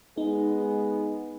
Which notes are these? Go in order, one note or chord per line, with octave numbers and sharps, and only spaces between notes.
G#3 B3 D#4